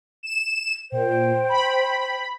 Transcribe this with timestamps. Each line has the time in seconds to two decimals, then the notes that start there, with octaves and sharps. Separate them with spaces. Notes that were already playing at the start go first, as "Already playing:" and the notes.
0.23 E7
0.92 A#2 C5 G5
1.49 B5